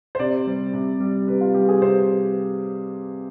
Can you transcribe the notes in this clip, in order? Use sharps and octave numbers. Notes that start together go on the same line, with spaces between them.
C5
C3 D5
G3
C3
G3
C3 B4
F4
G3 G4
G#4
C3 C5
C5